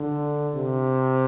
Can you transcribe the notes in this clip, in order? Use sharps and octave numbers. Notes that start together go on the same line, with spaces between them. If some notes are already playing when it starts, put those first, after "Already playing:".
Already playing: D3
C3